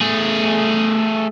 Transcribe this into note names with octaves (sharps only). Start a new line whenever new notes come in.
A3 G#4